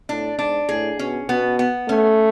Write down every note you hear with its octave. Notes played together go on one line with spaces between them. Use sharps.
A2 D4
G#2 D4
A2 G#4
B2 C#4
B2 B3
B3
A3 C#4